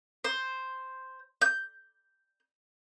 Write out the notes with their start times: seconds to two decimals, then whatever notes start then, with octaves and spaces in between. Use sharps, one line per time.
0.24 C5
1.42 G6